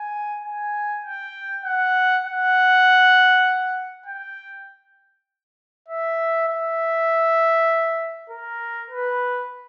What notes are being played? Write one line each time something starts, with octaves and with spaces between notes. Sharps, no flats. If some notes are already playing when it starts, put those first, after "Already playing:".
Already playing: G#5
G#5
G5
F#5
F#5
G5
E5
E5
A#4
B4